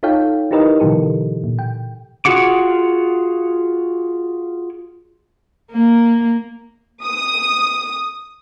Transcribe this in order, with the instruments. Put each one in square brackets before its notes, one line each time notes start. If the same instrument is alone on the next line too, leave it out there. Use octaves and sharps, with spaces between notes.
[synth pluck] D#4 F4 A4 C#5 F5 G5
D#4 E4 G4 A#4 B4 D#5
B2 D3 E3 F#3 G4 A4
A#2
G5
[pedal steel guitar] F4 F#4 G#4 F#5 D6
[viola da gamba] A#3
[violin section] D#6